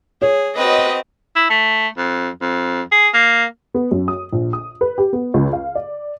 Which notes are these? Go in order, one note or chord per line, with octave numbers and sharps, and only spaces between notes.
G#4 C#5
C4 F#4 B4 D#5
E4
A3
F2
F2
G#4
A#3
B3
F#2
D#6
A#1
D#6
B4
G4
B3
C#2
F5
D5